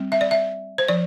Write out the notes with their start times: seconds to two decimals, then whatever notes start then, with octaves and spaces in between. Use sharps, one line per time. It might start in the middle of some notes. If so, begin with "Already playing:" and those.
Already playing: G3 C4
0.12 E5
0.21 D5
0.31 E5
0.78 C5
0.88 F3 D5